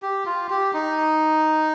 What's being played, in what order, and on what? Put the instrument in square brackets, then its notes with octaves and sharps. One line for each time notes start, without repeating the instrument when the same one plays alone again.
[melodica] G4
F4
G4
D#4